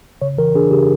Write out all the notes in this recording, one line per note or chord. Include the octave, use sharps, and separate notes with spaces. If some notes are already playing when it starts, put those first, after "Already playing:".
C#3 C#5
E3 A#4
D4 G#4
C#3 G4